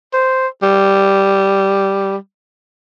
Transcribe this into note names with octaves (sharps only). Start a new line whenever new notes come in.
C5
G3